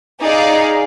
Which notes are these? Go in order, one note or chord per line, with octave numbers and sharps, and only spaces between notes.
D#4 G#4 D5 F5